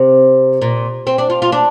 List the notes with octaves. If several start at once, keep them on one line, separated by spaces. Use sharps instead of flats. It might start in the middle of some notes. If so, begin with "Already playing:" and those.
Already playing: C3
A#2
C4
D4
F4
F4
D4